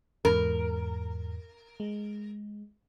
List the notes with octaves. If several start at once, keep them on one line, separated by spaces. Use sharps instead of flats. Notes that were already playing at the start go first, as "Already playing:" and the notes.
E2 G#2 A#4
G#3